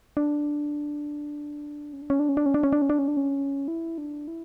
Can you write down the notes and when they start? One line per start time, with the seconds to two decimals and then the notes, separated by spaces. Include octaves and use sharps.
0.17 D4
1.93 C#4
2.02 D4
2.10 C#4
2.20 D4
2.29 C#4
2.37 D4
2.46 C#4
2.54 D4
2.63 C#4
2.73 D4
2.82 C#4
2.90 D4
2.99 C#4
3.08 D4
3.17 C#4
3.68 E4
3.98 D4
4.28 E4